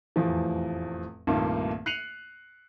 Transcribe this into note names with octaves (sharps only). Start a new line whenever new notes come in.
F1 E2 A2 E3 F3
C2 G2 A#2 D#3 A3 A#3
F#6 C7 C#7 D#7 F7 F#7